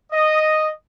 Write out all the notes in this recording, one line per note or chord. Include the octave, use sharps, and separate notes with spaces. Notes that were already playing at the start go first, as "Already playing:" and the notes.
D#5